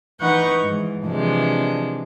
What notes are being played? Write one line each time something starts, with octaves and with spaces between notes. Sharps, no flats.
E3 D#4 B4 F#5 C#6 G6
G#2 E3
C3 E3 F3 G#3 D4